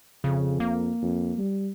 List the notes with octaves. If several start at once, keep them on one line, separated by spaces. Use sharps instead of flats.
F2 C#3
A#3
F2
G3